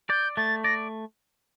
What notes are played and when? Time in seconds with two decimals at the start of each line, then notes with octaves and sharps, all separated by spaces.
0.09 D5 G6
0.36 A3 A6
0.64 D5 A#6